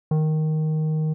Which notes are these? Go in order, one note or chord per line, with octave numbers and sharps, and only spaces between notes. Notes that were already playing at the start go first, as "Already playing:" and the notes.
D#3